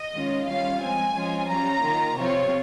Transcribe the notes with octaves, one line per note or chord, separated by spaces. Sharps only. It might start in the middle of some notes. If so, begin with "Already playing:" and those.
Already playing: D#5
D#3 G#3 C#4 F4
D#3 G3 C#4 F4 F5
F3 G#3 C4 G#5
F3 G#3 C#4 F4
G3 C#4 F4 A#5
D#3 A#3 F4
C3 F3 C4 F4 C#5